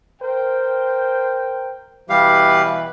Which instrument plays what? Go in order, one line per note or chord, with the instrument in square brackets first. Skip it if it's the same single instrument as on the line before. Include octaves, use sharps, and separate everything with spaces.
[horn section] A#4 C5 G5
[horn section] B2 E3 B4 [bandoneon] G3 G4 F5